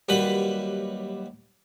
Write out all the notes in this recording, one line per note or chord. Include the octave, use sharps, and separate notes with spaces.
D#2 F#3 G3 B4 B5